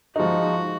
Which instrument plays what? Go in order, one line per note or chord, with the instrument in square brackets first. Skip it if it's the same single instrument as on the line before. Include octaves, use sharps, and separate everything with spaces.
[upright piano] F3 G#3 D#4 [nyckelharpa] F#4